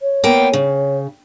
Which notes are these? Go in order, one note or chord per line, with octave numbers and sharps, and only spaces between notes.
C#5
A#3 B3 G5
C#3